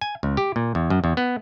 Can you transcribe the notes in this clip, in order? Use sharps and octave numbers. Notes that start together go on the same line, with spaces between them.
G#5
C#2
G4
A#2
E2
F#2
E2
B3